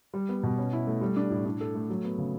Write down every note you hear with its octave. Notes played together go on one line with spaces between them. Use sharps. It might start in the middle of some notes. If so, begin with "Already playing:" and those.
G3
B3
B2
C#4
E4
A3
G3
D4
A2
D4
A4
A3
F#3
B3
C#3